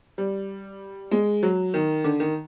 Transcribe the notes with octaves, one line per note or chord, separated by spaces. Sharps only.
G3
G#3
F#3
D#3
D3
D#3